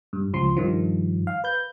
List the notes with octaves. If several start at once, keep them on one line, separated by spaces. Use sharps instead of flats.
G2
C#2 F3 C6
G2 D#3 F3
F5
B4 G6